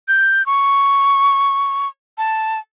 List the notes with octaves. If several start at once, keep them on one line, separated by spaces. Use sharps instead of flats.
G6
C#6
A5